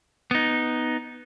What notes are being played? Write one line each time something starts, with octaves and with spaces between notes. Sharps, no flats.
B3 D#4